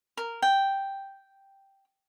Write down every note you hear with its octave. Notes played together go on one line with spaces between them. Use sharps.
A#4
G5